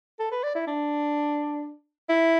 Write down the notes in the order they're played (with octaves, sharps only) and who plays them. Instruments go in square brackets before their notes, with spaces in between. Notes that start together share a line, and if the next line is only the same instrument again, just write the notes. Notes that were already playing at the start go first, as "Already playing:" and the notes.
[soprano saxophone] A4
B4
D5
E4
D4
E4